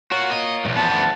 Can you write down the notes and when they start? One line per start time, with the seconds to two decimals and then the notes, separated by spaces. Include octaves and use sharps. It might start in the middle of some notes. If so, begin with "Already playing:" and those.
0.12 F4 F#4 A#4 C#5
0.31 D#5
0.65 B1 E2 G2
0.76 F3 B3 A5
0.91 D2